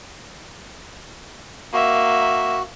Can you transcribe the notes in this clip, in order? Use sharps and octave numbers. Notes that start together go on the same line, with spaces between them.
A#3 F#4 E5